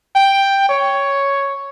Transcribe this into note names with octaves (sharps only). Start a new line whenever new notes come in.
G5
C#5